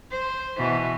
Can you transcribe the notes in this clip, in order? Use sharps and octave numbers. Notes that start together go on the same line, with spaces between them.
C5
B2 E3